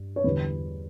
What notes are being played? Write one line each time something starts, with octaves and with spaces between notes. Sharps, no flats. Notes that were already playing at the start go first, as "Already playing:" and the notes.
Already playing: G2
C#5
E2 D3 G3 B4